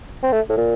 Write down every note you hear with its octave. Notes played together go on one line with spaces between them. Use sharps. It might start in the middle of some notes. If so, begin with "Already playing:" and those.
C4
A3
A2
A#2